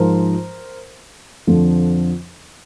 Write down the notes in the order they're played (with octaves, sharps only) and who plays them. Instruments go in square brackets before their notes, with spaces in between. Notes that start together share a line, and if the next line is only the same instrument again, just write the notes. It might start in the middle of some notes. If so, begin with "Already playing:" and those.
Already playing: [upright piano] G#2 F3 A#4 C5
F2 D3 F3